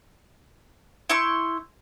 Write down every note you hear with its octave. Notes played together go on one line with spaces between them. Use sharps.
E4 C6 C#6 G6